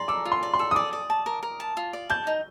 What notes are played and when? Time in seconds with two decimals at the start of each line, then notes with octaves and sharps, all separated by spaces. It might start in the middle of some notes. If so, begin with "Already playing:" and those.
Already playing: D5 A#5 C6
0.08 A4 D6
0.25 F4
0.32 C6
0.43 D5
0.54 C6
0.59 A4
0.71 D#6
0.75 D5 D6
0.93 D5
1.10 A5
1.26 A#4
1.43 A#4
1.60 A5
1.77 F4
1.93 D5
2.10 A5 G6
2.27 D#4